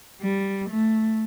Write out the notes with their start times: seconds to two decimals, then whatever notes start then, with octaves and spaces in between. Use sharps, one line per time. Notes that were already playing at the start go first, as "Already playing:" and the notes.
0.22 G3
0.70 A3